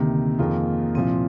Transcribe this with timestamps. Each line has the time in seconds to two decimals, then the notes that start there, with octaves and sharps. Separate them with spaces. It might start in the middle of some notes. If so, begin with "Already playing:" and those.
Already playing: D2 C3 D#3 A#3
0.38 F2 D#3 A#3 F4 G#4
0.95 C2 A#2 F3 C4